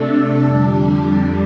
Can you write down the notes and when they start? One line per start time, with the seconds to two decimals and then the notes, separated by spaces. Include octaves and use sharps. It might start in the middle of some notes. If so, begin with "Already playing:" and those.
Already playing: C3 A3 D4 A4
0.42 F2 D3 G3 D4